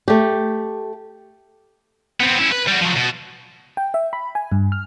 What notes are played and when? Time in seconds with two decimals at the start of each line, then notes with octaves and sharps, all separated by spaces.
0.08 A3 G4
2.20 B3 C4
2.39 C#4 E4
2.52 B4
2.68 G3 F#4
2.81 F3 F#3
2.97 B2
3.77 G5
3.94 E5
4.13 B5
4.35 G#5
4.52 G2
4.72 F6